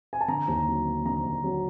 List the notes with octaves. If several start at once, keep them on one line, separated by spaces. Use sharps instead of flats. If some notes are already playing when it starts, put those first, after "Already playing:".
G#5
A5
D3 A#5
D#2
F#3
A#3
D3 A#5
D#2
F#3